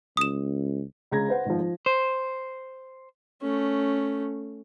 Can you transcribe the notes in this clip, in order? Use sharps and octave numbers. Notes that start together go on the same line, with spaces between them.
C#2 D#6 E7
C#2 C#3 A#5 G#6 A#6
B4 C5 F#5
G#1 F3
F3
C5
A3 C#4